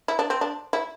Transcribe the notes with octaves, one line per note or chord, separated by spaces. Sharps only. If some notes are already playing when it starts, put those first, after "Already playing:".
E4
D4
C4
D4
E4